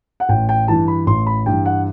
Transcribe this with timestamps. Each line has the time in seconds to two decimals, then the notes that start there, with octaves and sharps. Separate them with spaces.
0.20 F#5
0.29 A1 G5
0.49 G5
0.68 G2 E3 A5
0.88 B5
1.07 A1 C6
1.27 B5
1.46 G2 E3 G5
1.66 F#5